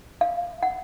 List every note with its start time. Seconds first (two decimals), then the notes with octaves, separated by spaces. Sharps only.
0.21 F5
0.63 F#5